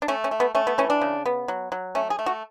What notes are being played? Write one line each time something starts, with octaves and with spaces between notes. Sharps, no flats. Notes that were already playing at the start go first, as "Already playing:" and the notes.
D4
A3 C#4
C#4
A3
B3
A3 C#4
B3
E3 C#4
D4
C#3
B3
F#3
F#3
A3 C#4
G#4
A3
F#4